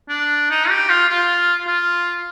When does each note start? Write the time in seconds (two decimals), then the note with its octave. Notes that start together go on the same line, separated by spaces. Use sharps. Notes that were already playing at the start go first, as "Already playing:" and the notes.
0.09 D4
0.50 D#4
0.70 G4
0.89 F4
1.09 F4
1.67 F4